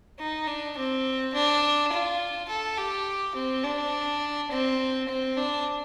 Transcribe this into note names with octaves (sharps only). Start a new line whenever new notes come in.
D#4
D4
C4
D4
F4
A4
G4
C4
D4
C4
C4
D4